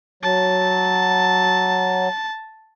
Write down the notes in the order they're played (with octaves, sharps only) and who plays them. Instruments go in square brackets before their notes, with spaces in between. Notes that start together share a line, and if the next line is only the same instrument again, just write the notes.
[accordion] F#3 [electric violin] A5